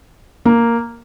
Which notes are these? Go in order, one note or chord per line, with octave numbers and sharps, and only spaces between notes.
A#3